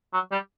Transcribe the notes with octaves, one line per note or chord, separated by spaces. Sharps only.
F#3
G3